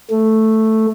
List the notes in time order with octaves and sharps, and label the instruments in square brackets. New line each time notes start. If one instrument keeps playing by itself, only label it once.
[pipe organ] A3